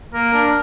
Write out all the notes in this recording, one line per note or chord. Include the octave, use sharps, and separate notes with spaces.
A#3 A#4
D4